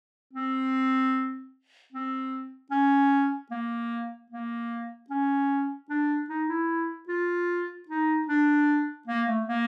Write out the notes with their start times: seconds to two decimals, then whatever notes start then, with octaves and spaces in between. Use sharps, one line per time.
0.33 C4
1.92 C4
2.71 C#4
3.51 A#3
4.30 A#3
5.10 C#4
5.89 D4
6.29 D#4
6.49 E4
7.08 F4
7.88 D#4
8.28 D4
9.07 A#3
9.27 A3
9.47 A#3